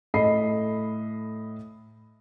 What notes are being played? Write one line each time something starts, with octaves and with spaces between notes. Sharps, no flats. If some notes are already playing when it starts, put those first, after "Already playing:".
A2 A4 D#5 B5 C7